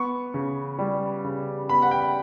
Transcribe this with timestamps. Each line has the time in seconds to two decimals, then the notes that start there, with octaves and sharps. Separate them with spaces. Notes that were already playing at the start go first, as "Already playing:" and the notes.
Already playing: B3 C#6
0.34 C#3
0.79 G3
1.24 C#3
1.69 B3 B5
1.82 F#5
1.91 G5